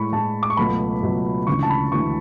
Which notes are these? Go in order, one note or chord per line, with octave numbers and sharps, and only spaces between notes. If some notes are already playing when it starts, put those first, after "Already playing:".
Already playing: A2 G#3 B5 C#6
A2 G#3 A5
D6
C#6
C#2 B2 F#3 A3 B5
C#2 B2 F#3 A3
D2 C#3 E3 G#3 C#6
A5
B5
D2 C#3 E3 G#3 C#6